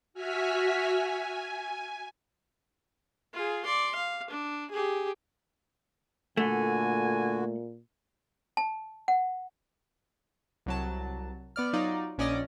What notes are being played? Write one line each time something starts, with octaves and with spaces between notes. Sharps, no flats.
F#4 E5 G#5 F6 B6
G#5
F4 G#4
D5 C6
F5
D4
G4 G#4
A#2 D3 A3 F#4 G#5
A5
F#5
C2 F#3 A5
B3 D5 F6
F#3 D#4 F4 D5
A#1 C#4 D5 D#5 A#6